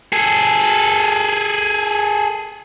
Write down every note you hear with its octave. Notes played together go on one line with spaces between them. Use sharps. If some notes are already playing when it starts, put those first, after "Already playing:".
G#4 A4